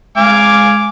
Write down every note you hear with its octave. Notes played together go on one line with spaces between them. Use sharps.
G#3 F5 G#5 D6